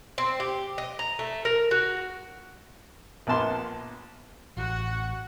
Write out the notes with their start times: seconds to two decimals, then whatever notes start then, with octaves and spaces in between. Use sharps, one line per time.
0.18 C4
0.40 G4
0.78 D#5
0.99 A#5
1.19 A3
1.45 A#4
1.71 F#4
3.27 A#1 A#3 B3 A5 C6
4.57 A1 F#4 F#5